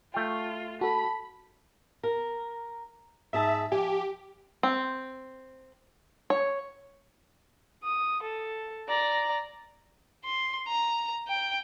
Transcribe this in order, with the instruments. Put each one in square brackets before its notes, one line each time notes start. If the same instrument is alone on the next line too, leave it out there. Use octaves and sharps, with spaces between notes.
[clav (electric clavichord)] A3 G5 [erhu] F4
[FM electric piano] F#4 A4 [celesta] A5 [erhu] B5
[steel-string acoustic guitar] A#4
[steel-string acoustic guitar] G#2 G#4 A5 [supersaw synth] E5
[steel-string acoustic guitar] F3 G#5 [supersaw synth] G4
[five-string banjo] C4
C#5
[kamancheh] D#6
A4
D5 A#5
[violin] C6
A#5
G5